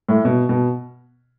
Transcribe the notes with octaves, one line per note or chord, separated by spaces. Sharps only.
A2
B2
B2